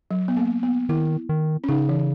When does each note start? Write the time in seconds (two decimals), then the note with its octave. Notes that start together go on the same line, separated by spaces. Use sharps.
0.11 F#3
0.28 B3
0.37 A#3
0.63 B3
0.89 D#3 E4
1.29 D#3
1.64 C#4
1.69 C#3 D#4
1.89 E3